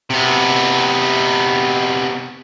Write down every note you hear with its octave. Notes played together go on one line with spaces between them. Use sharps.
C3 B3